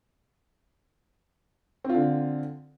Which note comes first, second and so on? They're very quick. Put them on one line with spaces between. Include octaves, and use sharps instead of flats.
C4 F4 D3